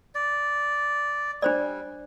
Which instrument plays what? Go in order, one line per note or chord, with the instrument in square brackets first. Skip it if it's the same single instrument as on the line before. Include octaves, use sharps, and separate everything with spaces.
[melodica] D5
[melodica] G3 [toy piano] D4 C5 D5